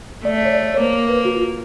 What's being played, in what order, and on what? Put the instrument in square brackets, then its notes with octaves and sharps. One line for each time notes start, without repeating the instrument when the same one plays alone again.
[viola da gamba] A3 [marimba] D5
[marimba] C#5
D5
C#5
[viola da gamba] A#3 [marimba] C5
[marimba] B4
F#4
F4